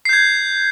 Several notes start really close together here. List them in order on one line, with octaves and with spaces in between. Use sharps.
C7 G6 G#6